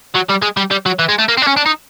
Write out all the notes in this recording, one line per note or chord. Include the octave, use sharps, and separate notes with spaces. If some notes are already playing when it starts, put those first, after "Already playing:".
F#3
G3
G#3
G3
G3
F#3
E3
G#3
A3
A#3
C4
D4
C#4
D4
D#4